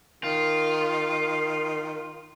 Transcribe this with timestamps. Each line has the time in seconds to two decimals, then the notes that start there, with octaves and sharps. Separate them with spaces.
0.24 D#3 F4